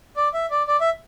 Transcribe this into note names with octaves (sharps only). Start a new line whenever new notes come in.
D5
E5
D5
D5
E5